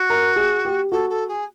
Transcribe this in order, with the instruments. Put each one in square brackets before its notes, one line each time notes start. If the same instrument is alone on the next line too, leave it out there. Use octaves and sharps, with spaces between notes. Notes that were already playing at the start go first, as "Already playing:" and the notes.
Already playing: [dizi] F#4
[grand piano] A#4
G#4
G4
[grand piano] F#4 [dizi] A4
[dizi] A4
G#4